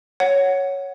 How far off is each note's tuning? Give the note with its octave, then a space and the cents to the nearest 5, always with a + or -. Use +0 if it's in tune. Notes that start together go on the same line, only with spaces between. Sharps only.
C#5 +0 F#5 +0